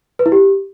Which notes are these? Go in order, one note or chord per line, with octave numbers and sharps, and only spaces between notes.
B4
E4
G4